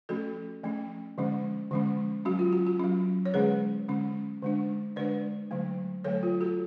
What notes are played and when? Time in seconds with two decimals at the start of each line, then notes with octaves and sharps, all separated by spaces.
0.09 F3 A3 C#4 F#4 A4
0.63 F3 A3 C#4
1.18 D3 F3 G#3 C#4
1.71 D3 F3 G#3 C#4
2.25 F#3 C#4 F#4
2.39 F4
2.53 F#4
2.67 F#4
2.80 F#3 C#4
3.26 C#5
3.34 D3 G#3 C#4 G#4 B4
3.88 D3 G#3 C#4
4.42 D3 G#3 D4
4.96 D3 G#3 D4 B4 D5
5.51 D3 F#3 A3
6.04 D3 F#3 A3 A4 C#5
6.23 F4
6.41 F#4 A4